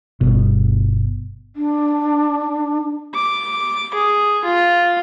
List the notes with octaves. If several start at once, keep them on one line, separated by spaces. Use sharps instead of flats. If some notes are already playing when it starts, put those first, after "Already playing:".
G1 B2
D4
D6
G#4
F4